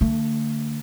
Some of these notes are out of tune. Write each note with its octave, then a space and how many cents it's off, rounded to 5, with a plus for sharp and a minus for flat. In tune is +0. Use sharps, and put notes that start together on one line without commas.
D3 +0 A3 +40